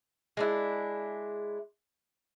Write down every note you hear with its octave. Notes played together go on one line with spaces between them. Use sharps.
G#3 D4 E4